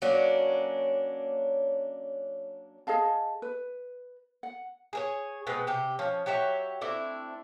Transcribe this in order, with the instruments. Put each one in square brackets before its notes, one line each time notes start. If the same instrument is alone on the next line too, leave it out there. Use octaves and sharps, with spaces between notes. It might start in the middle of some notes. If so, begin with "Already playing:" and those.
[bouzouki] F#3 A#3 C#4 D4
[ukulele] G#4 D#5 F5 A5
B4
F#5
[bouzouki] G#4 A#4 C#5
B2 G#3 C4 B4
C3 G4
F3 C#4
F#3 G4 C#5 E5
A3 C4 D4 E4